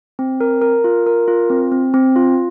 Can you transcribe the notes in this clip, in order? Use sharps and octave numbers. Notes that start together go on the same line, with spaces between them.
C4
A#4
A#4
F4
A#4
F4
C4
C4
C4
F4